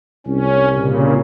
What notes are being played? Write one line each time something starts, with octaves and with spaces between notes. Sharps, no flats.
C2 C#4
A#2 C#3